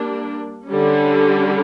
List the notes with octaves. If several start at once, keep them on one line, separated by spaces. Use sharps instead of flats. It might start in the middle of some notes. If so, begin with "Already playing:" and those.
Already playing: G3 A#3 D4
D3 G3 C#4